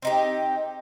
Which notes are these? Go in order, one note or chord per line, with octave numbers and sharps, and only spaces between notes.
C4 D#4 G4